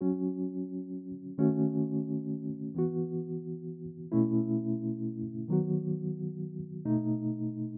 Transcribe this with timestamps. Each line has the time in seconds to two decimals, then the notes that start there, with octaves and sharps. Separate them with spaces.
0.01 F#3 C#4 F#4
1.38 D#3 A3 C#4 F#4
2.75 E3 B3 F#4
4.12 B2 A3 C#4 E4
5.48 D#3 F#3 B3 F#4
6.85 B2 A3 D#4